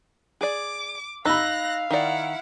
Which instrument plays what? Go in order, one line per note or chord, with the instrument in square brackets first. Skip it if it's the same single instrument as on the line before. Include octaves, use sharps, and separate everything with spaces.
[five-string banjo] G#4 D5 [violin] D6
[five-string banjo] D#4 [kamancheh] F5 [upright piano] B5 E6 [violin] F#6 A#6
[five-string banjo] D#3 D5 [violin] E4 F#5